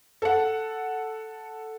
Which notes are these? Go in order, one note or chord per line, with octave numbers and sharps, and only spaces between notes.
A4 F#5